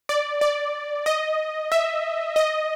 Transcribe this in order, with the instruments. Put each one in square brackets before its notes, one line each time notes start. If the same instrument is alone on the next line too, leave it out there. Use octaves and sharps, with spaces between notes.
[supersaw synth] D5
D5
D#5
E5
D#5